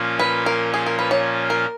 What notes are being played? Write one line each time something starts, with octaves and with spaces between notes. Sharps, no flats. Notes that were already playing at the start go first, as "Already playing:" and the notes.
Already playing: A#2 F3 A#3 C#4 F4
B4
A#4
G#4
A#4
B4
C#5
A#4